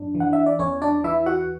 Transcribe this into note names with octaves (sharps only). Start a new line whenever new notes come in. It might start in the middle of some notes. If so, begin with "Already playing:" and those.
Already playing: F#2 D4
E3
F#5
E5
D5
E2 C#4 C#5
D4 D5
E3 E4 E5
F#4 F#5